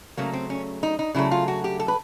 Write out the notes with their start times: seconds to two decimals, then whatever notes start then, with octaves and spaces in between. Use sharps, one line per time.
0.17 C#3 F#3 A3 A#3
0.33 C4
0.50 C#4
0.83 D#4
0.99 D#4
1.15 C#3 F#3 A3 E4
1.31 F4
1.48 F#4
1.64 G4
1.80 A4
1.88 B4